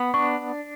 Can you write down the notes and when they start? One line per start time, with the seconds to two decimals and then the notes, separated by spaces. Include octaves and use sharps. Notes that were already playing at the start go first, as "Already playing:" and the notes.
Already playing: B3
0.14 D4 C#6